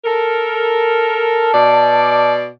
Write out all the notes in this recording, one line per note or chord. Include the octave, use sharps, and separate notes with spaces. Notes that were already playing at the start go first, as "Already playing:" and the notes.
A4 A#4
A5
B2 D5